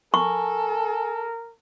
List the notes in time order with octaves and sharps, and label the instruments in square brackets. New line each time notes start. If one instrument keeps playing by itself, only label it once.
[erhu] A4 [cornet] A#4 [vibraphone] G#5 [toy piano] C#6